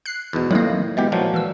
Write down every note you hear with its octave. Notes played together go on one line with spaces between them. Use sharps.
F#6 C7
E2 G#2 B2
F2 A2 D#3 F#3 A#3
B2 E3 G#3 B3 G4
A#2 F3 F#3
E3 E6